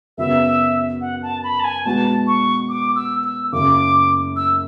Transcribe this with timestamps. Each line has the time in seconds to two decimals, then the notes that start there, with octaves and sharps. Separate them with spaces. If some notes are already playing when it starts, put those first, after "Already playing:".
0.17 F#2 C#3 F#3 B3 F#4 E5
1.01 F#5
1.23 A5
1.44 B5
1.60 A5
1.64 G#5
1.84 B2 G#3 B3 F#4 A5
2.27 C#6
2.69 D6
2.96 E6
3.24 E6
3.52 F#1 F#2 C#3 D6
4.36 E6